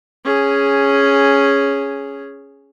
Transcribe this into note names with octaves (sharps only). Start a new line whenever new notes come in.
C#4 G#4